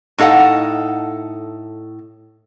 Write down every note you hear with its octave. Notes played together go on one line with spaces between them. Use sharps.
A2 D#4 A4 F5 F#5